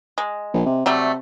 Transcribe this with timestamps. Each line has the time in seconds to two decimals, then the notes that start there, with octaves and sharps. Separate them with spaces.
0.18 G#3
0.54 A#1
0.66 C3
0.86 C3 F#3 G3 A3